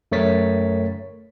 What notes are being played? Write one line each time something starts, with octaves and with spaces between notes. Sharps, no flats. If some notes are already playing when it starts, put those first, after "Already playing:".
F#2 A3 A#4 C#5 A6 B6